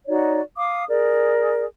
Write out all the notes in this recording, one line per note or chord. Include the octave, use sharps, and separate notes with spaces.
D#4 F#4 C#5 D5
F5 D6 D#6
G#4 A#4 D5